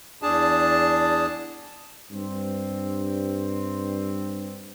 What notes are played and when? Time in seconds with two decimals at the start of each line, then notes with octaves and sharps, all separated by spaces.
0.22 E2 D4 G#4 A5
2.11 G2 C4